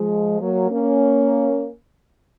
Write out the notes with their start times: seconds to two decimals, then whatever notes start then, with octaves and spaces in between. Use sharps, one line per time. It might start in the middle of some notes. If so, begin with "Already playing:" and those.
Already playing: F3 G#3
0.40 F#3 A#3
0.71 A#3 C#4